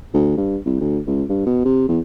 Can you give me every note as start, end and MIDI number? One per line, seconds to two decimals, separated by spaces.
0.14 0.33 38
0.37 0.58 43
0.66 0.79 36
0.81 0.99 38
1.07 1.24 37
1.29 1.41 43
1.46 1.61 47
1.65 1.86 48
1.89 1.99 40